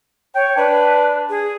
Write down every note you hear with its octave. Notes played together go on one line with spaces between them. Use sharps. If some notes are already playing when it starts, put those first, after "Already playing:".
C#5 G5
D4 B4
G#4